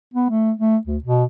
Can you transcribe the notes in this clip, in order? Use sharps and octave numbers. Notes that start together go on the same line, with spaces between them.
B3
A3
A3
D2
B2